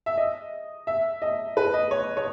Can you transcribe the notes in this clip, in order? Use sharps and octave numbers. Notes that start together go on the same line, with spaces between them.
E5
D#5
E5
D#5
B4
D#5
C#5
C#5